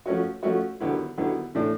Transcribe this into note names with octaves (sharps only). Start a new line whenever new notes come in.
F3 A3 C#4 F#4
F3 A3 C#4 F#4
D#2 D3 F#3 B3 E4
D#2 D3 F#3 B3 E4
A2 E3 A3 D4